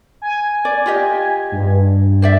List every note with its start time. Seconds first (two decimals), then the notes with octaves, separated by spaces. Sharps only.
0.22 G#5
0.65 D5
0.86 F4 G4 D#5
1.52 G2
2.22 C5 D5 E5